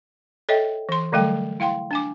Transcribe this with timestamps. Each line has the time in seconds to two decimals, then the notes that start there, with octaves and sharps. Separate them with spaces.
0.49 A4 C#5 D#5 E5 G5
0.89 E3 C6
1.12 D3 F#3 G3 A3 A4 G5
1.60 E4 F5 G5 C6
1.91 D4 G#5 D6